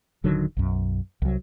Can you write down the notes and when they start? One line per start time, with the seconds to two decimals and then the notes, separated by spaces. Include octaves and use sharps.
0.24 D#1 D3 D#3 F#3
0.57 B1 F#2
1.22 C2 F#3